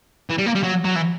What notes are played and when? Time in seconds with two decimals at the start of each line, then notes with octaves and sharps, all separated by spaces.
0.30 E3
0.38 G3
0.46 A#3
0.55 G3
0.63 F#3
0.84 F#3
0.95 E3